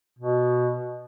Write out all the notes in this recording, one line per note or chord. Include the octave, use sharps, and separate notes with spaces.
B2